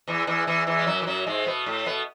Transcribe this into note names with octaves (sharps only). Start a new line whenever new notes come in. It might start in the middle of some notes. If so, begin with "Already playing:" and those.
E2 E3
E2 E3
E2 E3
E2 E3
G#3
F#2 F#3
E3
F#2 F#3
G#2 G#3
B2 B3
A2 A3
B2 B3